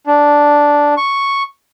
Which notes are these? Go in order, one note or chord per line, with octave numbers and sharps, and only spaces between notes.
D4
C#6